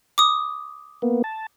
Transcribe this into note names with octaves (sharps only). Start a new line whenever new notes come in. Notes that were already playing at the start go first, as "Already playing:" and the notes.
D6 D#6
A#3 B3
A5